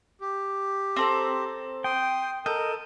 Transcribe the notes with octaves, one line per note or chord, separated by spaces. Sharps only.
G4
C4 A4 A#5
G5 C6 D#6
A4 A#4 D#5 G6